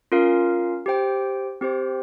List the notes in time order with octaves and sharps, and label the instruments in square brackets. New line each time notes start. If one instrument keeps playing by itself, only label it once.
[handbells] C#4 F4 A#4 F5
G4 C5 G5
C4 G4 C5